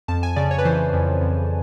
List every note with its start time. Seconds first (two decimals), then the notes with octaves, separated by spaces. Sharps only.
0.08 F2 A5
0.23 G#5
0.36 C#3 D5
0.51 C#5
0.58 B4
0.65 E3 C5
0.93 F2
1.21 F2